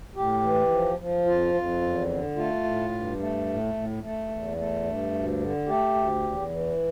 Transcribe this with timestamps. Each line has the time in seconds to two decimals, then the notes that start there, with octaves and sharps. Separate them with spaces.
0.16 A2 G4
0.43 E3
0.71 F3
0.99 F3
1.26 F2 F4
1.54 F2
1.82 E2
2.09 D3
2.36 A3 F4
2.64 A2
2.92 G2
3.19 A3
3.47 A2
3.74 A2
4.02 A3
4.30 E2
4.57 A3
4.84 G2
5.13 D2
5.39 D3
5.67 A3 G4
5.94 D2
6.22 E2
6.50 E3